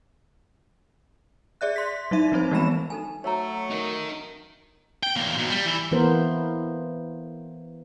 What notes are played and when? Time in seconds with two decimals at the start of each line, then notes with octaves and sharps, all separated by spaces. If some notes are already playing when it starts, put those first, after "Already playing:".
1.61 G#4 D5 E5 F#6
1.76 C6 B6
2.11 F#3 D#4 E5 D#7
2.32 F3 C4 D#4 C5
2.51 E3 G3 G#3 B3 B5 E7
2.90 D#4 A4 G#5
3.24 F#3 A3 C#5 A#5
3.71 D#4 A#4
5.03 G5
5.16 E2 A#3
5.37 B2 F#3
5.50 G3
5.66 E3 E4
5.92 E3 A#3 B3 A#4 C5